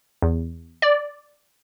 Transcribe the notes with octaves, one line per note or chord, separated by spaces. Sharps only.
E2
D5